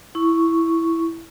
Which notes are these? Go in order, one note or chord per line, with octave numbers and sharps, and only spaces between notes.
E4 C#6